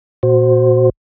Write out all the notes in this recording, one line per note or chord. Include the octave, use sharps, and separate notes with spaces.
A#2 F#4 C5